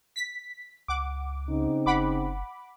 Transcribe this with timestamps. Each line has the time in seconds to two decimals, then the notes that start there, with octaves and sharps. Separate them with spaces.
0.16 B6
0.88 C#2 F#5 D6
1.49 C#3 C4 D#4
1.86 F#1 F#5 B5 D6